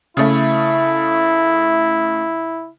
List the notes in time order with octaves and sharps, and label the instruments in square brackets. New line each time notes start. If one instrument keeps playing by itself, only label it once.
[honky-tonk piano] C#3 A3 [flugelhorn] E4